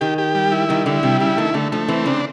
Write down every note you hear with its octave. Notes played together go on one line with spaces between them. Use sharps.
D#3 G4
G4
G3
E4
D#3 G3
D3 E4
C3 G3
C#3 E4
D#3 A3
D3 A3
F3 A3
E3 C4
C#3 D4